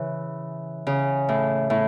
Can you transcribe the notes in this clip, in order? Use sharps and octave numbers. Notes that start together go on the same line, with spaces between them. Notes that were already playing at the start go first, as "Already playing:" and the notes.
Already playing: C#3 E3
C#3
A2
A2